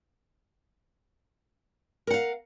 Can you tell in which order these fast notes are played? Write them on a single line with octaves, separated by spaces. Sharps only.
A#4 F#5 F5